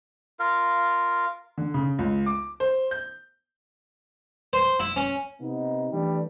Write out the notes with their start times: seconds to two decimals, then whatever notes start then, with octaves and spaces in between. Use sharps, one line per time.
0.39 F4 A#4 F5
1.58 D3
1.74 C#3
1.99 C#2
2.26 D6
2.60 C5
2.91 G6
4.53 C5
4.80 E4
4.96 C#4
5.41 C3 B3 D#4
5.92 E3 G3 A3 D4